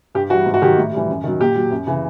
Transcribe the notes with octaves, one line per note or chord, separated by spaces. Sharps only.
G2 G4
E3 G3 F#4
G#2
F#4
D#3 F#3 G4
A2
E3 G3
F#2
D#3 F#3
A#2 G4
F#3
F#2
C#3 E3